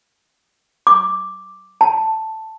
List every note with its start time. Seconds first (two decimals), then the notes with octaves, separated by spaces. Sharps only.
0.87 D6
1.81 A5